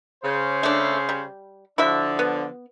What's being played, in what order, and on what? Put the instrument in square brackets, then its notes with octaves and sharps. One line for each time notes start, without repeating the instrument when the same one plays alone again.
[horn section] C#3 C5
[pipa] A3 D4
G3
[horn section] D3 F3 D4 [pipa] E4 F#4 E5
[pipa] B3